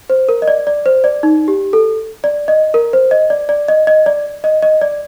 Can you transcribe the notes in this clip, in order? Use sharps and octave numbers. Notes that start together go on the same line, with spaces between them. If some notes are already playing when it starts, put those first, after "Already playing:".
C5
A#4
D#5
D5
D5
C5
D5
D#4
G4
A4
D5
D#5
A#4
C5
D#5
D5
D5
D#5
D#5
D5
D#5
D#5
D5